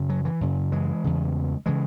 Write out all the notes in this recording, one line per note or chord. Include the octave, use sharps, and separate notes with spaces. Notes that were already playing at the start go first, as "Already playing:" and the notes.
Already playing: F#2 C#3
F#3
E3
F#2 C#3
E3 G#3
E2 C#3
C#3 E3 G#3